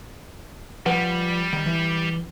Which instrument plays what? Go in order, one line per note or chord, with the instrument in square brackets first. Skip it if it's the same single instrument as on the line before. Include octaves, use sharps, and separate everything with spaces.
[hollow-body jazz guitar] F3 B4 F#5 [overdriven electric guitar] G3
[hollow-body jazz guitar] D#3
E3